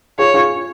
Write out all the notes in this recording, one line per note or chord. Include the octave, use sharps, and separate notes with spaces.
F4 G#4 C#5
F4 G#4